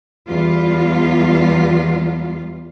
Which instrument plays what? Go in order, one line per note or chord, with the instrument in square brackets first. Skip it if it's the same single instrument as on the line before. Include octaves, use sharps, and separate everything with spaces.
[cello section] E2 G3 F4